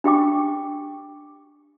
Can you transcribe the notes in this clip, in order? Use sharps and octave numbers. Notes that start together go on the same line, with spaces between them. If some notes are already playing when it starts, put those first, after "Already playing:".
D4 G4 G5 D6